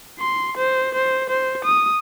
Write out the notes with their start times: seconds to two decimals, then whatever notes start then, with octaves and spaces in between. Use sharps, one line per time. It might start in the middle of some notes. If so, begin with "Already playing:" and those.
0.19 C6
0.57 C5
0.94 C5
1.30 C5
1.65 D#6